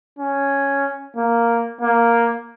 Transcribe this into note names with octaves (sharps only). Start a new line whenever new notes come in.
C#4
A#3
A#3